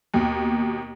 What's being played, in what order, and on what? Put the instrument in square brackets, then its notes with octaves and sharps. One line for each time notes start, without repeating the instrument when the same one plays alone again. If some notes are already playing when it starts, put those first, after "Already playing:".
[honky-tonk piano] D#2 B2